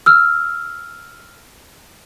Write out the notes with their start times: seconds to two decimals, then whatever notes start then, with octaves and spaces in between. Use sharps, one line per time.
0.06 E6 F6